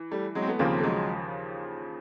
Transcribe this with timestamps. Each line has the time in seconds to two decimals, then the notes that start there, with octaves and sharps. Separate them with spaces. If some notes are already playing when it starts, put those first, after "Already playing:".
Already playing: E3
0.11 G3 A3
0.35 F#3 G#3
0.42 C4
0.47 A3 B3
0.59 D#2 C#3 F3 A#3 C4
0.78 A3
0.83 F#3 G#3